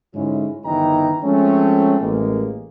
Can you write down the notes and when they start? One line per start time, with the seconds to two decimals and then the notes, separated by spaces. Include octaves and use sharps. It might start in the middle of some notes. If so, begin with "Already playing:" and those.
0.14 G#2 D3 F#3 G#3 C#4 E4
0.65 G1 D#3 E3 D#4 G5 A#5
1.23 F3 G#3 A3 C4 C#4
2.00 A1 G#3 A#3